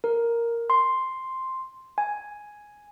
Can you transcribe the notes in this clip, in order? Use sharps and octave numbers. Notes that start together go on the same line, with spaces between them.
A#4
C6
G#5